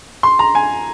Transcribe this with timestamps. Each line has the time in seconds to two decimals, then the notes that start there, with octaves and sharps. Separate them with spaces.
0.23 C6
0.39 A#5
0.55 G#5